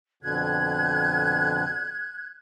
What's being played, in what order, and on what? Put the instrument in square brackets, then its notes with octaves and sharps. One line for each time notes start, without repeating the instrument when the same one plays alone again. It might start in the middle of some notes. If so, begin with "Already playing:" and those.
[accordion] F2 B2 D3 [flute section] F#6 G#6